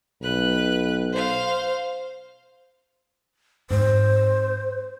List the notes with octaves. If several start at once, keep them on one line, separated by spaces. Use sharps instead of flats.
B1 B4 F#6
C5 F5
G#2 C4 C5